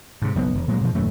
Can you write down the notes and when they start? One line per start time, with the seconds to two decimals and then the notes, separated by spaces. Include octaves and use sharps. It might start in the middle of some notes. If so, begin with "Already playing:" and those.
0.22 G#2 C3
0.35 F#1 B1 C#3 B3
0.55 E1
0.68 A#2 F#3 G#3
0.81 B2 E3 F3
0.95 D#1 F#2 F#3 A3